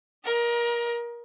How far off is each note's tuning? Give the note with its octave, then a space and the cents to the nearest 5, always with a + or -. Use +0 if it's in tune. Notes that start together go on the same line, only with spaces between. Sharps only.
A#4 +25 D#5 +0